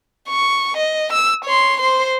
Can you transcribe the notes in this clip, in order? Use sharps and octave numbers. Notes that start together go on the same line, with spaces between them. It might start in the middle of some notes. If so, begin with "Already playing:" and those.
C#6
D#5
E6
C#5 C6
C5 C6